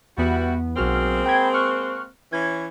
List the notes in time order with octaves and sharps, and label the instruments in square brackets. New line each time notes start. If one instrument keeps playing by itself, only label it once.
[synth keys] E2 B3 [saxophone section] G3 E4 F#4
[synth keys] B1 F#4 F6 [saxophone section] G#3 A#3 C4
[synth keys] G5 B5 G#6
C#6 F6 F#6
[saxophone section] E3 C#4 [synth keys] G#6